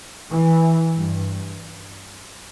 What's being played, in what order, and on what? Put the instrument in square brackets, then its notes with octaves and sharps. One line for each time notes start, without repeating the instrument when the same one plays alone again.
[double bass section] E3
G2